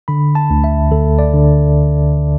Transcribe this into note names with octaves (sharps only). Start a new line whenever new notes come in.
D3 B5
A5
D2
E5
D2 A4
D5
D3